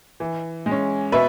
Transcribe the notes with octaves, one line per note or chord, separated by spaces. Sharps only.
E3
G#3
C#4
B2 B4 E5